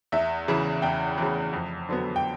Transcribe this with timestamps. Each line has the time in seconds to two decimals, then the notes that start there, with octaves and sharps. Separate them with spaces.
0.12 E2 E5
0.48 C#3 E3
0.82 E2 G5
1.18 C#3 E3
1.53 F2
1.89 D3 F#3 B3
2.16 G5